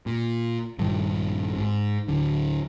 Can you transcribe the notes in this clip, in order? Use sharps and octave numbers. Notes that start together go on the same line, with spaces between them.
A#2
A#1 G2 D#3
G#2
D1 D3